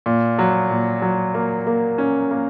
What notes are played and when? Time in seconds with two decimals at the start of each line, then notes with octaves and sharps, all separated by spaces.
0.06 A#2
0.39 F#3
0.71 A#2
1.02 F#3
1.34 A#3
1.67 A#3
1.98 C#4
2.31 A#3